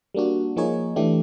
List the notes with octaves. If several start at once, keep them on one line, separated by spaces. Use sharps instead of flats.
G3 A#3 D4 F#4
F3 A#3 D#4 G#4 C#5
E3 A3 D4 G4